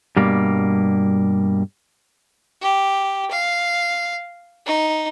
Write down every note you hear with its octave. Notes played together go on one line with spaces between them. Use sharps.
G2 B2 G3 A#3
G4
F5
D#4